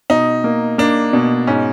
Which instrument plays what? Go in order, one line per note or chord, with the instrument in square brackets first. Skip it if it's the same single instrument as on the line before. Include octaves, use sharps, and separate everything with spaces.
[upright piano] B2 [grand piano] D#4
[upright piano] A#3
[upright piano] A#3 [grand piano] D4
[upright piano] B2
[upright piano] G#2 [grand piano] C#4